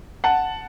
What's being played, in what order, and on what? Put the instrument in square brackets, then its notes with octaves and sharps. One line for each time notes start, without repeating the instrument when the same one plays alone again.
[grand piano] F#5 A5